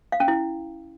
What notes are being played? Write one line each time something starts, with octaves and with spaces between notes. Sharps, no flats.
F5
C#4
E4